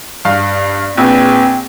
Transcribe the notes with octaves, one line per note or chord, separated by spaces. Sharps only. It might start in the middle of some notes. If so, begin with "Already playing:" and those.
G2 F5
A#1 B3 C4